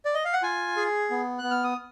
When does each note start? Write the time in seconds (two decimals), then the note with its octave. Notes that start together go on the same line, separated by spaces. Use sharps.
0.05 D5
0.14 D#5
0.25 F5
0.33 F#5
0.42 F4 G#5
0.76 G#4
1.10 B3
1.38 B3 F#6
1.51 F6
1.64 D#6